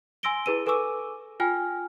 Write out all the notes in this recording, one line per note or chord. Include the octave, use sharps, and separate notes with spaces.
G#5 C6 E6 A#6 D7 G7
E4 G#4 B4 E6 D#7
A4 B4 G#5 C#6 D6 E6
F4 G5 G#5 F6